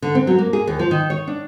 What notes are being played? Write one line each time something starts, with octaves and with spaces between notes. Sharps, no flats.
D3
C4
F#3
A#3
G#4
D#2
F3
D#3
C#5
D4